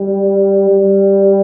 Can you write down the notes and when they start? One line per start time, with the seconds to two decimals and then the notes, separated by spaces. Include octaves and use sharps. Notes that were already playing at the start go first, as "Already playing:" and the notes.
Already playing: G3
0.70 G3